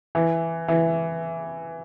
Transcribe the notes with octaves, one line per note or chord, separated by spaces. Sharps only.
E3
E3